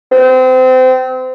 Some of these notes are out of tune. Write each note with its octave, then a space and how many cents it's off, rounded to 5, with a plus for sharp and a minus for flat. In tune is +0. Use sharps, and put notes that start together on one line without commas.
C4 -30